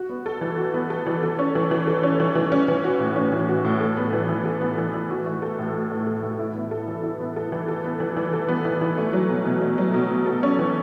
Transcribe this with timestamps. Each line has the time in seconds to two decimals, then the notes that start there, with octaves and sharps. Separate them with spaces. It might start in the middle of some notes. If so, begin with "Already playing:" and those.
Already playing: F#4
0.09 B3
0.26 A4
0.41 E3
0.57 F#4
0.74 B3
0.90 A4
1.06 E3
1.23 A4
1.39 C#4
1.55 E3
1.71 E3
1.87 A4
2.03 C#4
2.20 E3
2.35 E3
2.52 C#4
2.68 E3
2.84 F#4
3.00 A2
3.16 C#4
3.32 E3
3.49 F#4
3.65 A2
3.80 A4
3.97 B3
4.13 E3
4.29 E3
4.45 A4
4.61 B3
4.78 E3
4.94 E3
5.10 F#4
5.26 A3
5.42 A4
5.59 A2
5.74 F#4
5.91 A3
6.07 A4
6.23 A2
6.39 E4
6.55 B3
6.71 A4
6.88 E3
7.03 E4
7.20 B3
7.36 A4
7.52 E3
7.68 A4
7.84 B3
8.00 E3
8.17 E3
8.33 A4
8.48 B3
8.65 E3
8.81 E3
8.97 A3
9.13 F#3
9.29 B2
9.46 B2
9.62 A3
9.78 F#3
9.94 B2
10.10 B2
10.26 A4
10.43 C#4
10.59 E3